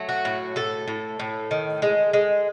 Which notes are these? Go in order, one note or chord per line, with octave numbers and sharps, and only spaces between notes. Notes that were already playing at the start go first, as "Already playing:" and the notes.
Already playing: F#3 A3
F#4
A2
A2 A4
A2
A2
D#3
G#3
G#3